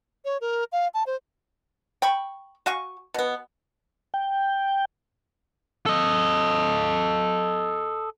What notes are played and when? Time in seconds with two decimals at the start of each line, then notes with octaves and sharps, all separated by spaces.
0.25 C#5
0.41 A#4
0.72 F5
0.94 A5
1.06 C5
2.02 G5 B5 C#6
2.66 F#4 F5 G#5 C#6
3.14 B2 B3
4.14 G5
5.86 A4 D#5